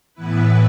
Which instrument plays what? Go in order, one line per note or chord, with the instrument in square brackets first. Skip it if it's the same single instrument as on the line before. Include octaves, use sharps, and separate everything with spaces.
[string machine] A2 E3 B3 E4 B4